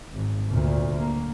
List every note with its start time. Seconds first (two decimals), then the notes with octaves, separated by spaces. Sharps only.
0.13 G#1
0.49 D2 A#2
1.01 A#3